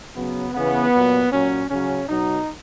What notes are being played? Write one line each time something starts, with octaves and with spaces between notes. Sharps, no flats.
C#3 F#3 B3
C#3 E3 B3
A#2 F#3
A#2 F#3 C#4
C#3 F#3 C#4
B2 F#3 D#4